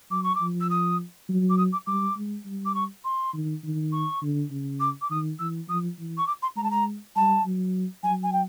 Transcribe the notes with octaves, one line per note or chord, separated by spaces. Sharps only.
F#3 D6
C#6
D6
F3
E6
D#6
F#3
D6
D#6
D6
G3 D6
G#3
G3
D6
C#6
C6
D#3
D#3
C#6
D3
C#3
D6
D6
D#3 D#6
E3 E6
F3 D#6
E3
C#6
D6
C6
G#3 A#5
A5
A#5
G3 A5
F#3
F#3 G#5
G#5
G5